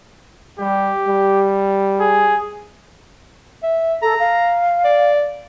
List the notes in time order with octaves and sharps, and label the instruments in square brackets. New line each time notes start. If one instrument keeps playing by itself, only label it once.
[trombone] G3 [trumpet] G4
[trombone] G3
[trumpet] G#4
[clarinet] E5
[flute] A4 [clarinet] A#5
[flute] F5
[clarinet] D5